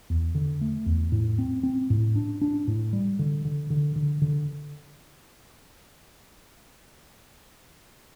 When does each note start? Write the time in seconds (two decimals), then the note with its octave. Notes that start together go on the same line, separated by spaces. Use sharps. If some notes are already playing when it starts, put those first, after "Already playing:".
0.10 E2
0.35 D3
0.61 A3
0.86 E2
1.12 A2
1.38 C4
1.63 C4
1.90 A2
2.16 D4
2.42 D4
2.68 A2
2.93 G3
3.19 D3
3.45 D3
3.70 D3
3.96 D3
4.22 D3